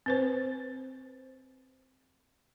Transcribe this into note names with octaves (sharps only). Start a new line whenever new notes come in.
C4 B4 C5